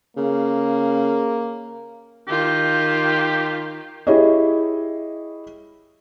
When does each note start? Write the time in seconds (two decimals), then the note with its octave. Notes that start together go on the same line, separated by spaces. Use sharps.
0.17 C#3 A#3
2.28 D#3 F4 G4
4.07 E4 G4 G#4 C#5 D#5